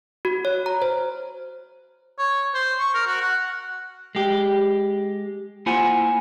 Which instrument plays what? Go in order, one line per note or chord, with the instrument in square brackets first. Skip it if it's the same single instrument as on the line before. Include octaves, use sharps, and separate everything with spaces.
[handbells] F#4
C#5
A#5
C5
[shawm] C#5
C5
C#6
A#4
F#4
F#5
[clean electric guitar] G#3 G4
A#3 E4 F4 C5 F#5 G#5